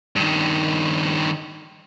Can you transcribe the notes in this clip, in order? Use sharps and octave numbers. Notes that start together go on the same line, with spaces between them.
G2 D#3